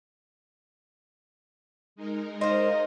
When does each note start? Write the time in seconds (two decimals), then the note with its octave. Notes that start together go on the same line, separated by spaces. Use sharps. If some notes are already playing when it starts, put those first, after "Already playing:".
1.96 G#3 D#4 A#4
2.41 C5 D#5 F5